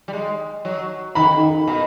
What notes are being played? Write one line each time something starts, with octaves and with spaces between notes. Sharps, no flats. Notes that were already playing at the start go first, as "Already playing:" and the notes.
G3
G#3
F#3
D#3 B5
B2